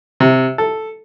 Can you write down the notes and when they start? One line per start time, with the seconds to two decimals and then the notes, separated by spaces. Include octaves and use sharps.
0.20 C3
0.58 A4